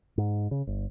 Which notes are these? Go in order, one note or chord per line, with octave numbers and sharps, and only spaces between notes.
G#2
C#3
G1